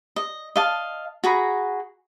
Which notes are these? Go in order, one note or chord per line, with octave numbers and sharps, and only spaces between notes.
D#5
D#5 F5 A5
F#4 G#4 A#5 B5